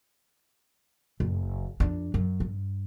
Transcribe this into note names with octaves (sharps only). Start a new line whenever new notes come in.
F#1
F2 D4
F#2
G2